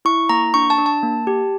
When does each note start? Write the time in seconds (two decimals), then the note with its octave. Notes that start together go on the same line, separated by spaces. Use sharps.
0.05 E4 C#6
0.29 A#3 A#5
0.54 D4 C#6
0.70 A5
0.78 D4
0.86 A5
1.03 A#3
1.27 G4